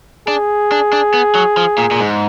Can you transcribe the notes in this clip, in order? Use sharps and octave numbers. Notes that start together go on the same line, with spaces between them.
D4 G#4
D4
D4
B3
F#3
F3
A#2
A#2
G#2